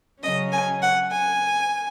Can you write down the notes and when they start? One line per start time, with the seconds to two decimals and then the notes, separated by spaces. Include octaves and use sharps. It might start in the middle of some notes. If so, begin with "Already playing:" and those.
0.22 C#3 F#3 C#4 D#5
0.52 G#5
0.81 F#5
1.11 G#5